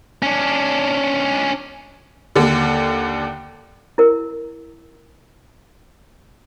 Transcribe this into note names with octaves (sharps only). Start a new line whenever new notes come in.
C#4 D4
D#2 D3
E4 A#4